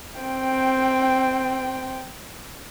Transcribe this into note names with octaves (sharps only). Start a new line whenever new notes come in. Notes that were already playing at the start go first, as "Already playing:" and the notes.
C4 G5